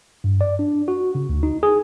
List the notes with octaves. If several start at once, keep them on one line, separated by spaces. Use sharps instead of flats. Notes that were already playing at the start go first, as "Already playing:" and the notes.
G2
D5
D4
F#4
C#3
D2
D#4
G#4